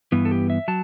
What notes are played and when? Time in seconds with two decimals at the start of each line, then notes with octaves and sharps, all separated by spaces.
0.12 G2 E3 B3
0.25 A4
0.31 G4
0.50 E5
0.68 F#3 A5